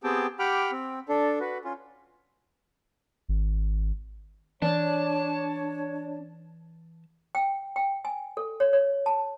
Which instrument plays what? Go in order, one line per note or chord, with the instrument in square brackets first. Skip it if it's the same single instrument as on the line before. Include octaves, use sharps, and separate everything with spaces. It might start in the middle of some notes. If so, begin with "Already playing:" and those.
[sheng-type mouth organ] B3 C4 G4 G#4 G5 A5
G4 F#5 G5 B5 D6 F6
C4
D4 A4
F#4 B4
C#4 F4
[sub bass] G#1
[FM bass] E3 [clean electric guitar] D4 [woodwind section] C#5 [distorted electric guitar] A5
[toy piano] G5
G5
G#5
A4
C#5
C#5
A5